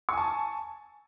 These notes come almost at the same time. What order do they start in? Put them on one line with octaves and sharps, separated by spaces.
C#6 G#5 A5